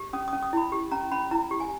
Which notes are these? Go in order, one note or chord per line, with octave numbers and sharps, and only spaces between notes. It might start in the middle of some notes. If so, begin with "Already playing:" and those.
Already playing: G4
C#4 D#6
D#6
C#4
D#6
E4 B5
G4
C#4 A#5
C#4 B5
E4 A#5
G4
G#5